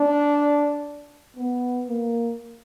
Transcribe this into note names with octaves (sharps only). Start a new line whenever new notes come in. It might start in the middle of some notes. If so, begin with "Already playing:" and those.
Already playing: D4
B3
A#3